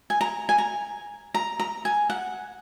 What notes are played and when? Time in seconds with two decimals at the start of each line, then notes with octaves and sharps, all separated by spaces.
0.10 G#5
0.21 A#5
0.49 G#5
0.58 A#5
1.34 A#5
1.59 A#5
1.85 G#5
2.10 F#5